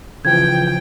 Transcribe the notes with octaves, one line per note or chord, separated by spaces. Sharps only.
C#3 E3 F3 G5 G#6